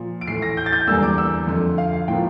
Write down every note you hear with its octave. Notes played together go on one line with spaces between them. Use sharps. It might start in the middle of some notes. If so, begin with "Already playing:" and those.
Already playing: A#2 F3
D7
A2 E3 A3 C7
A#6
G6
A6
G6
E2 D3 G3 A#3 E6
D6
E6
F2 D3 A3
F5
F5
A2 F3 A#3 G5